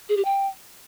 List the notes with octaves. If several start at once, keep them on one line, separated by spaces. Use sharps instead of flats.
G#4
G4
G5